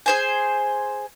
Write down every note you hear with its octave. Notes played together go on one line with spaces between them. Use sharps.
G#4 C5 G#5